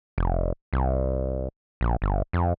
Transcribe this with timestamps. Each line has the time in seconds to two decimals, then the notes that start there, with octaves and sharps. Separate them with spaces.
0.18 F1
0.73 C2
1.81 A#1
2.02 G1
2.33 F2